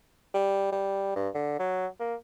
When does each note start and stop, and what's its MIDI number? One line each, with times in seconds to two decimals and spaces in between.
0.34 0.69 55
0.72 1.11 55
1.16 1.28 43
1.35 1.56 50
1.59 1.87 54
2.00 2.15 58